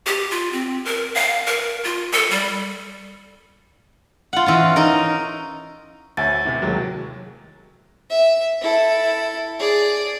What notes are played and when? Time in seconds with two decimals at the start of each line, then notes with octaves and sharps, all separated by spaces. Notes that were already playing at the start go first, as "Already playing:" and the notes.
0.06 G4
0.31 F4
0.53 C4
0.85 A#4
1.15 F5
1.47 A#4
1.84 F4
2.13 A4
2.31 G3
4.33 F4 F#5
4.46 E3 C#4 F4
4.76 D#4 A#4
6.17 D2 C#5 E5 G#5 A6
6.45 A2 C3
6.62 D#2 F#3 G#3 A#4
8.10 E5
8.62 E4 A4
9.59 G#4 D5